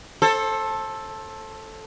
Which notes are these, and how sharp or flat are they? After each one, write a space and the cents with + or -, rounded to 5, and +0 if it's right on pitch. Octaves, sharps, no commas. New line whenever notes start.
A4 +0 C5 +35